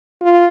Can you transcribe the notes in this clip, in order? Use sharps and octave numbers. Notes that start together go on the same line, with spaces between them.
F4